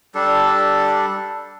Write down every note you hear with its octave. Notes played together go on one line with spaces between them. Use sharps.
G3 D4 A4